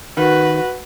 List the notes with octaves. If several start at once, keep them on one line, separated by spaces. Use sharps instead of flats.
D#3 F#4 B4